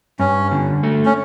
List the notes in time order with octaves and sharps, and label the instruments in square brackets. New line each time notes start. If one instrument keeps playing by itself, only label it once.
[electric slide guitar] G2 [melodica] C#4
[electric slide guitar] D3
A3
[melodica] C#4